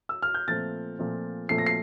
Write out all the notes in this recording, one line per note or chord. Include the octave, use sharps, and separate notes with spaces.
E6
F6
G6
A#2 F3 A3 C4 A6
A#2 F3 A3 C4
A#2 F3 A3 C4 C7
A#6
C7